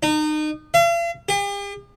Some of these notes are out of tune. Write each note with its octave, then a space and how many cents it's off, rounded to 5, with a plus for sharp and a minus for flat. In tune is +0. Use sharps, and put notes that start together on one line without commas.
D#4 -30
F5 -45
G4 +45